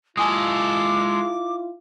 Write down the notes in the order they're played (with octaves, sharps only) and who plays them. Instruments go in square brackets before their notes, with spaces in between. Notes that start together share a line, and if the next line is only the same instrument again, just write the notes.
[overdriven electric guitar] G#3 A4 [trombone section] E4 F4 [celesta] G#5 D#6 [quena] D6